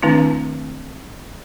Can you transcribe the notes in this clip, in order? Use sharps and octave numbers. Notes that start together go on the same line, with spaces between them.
D#3 A3 C4 D4 E4